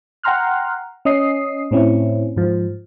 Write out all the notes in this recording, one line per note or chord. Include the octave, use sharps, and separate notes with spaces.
F#5 G5 A#5 C6 F6 F#6
C#4 D#5 D#6 C7
A2 C4 C#4 E4
G#2 F3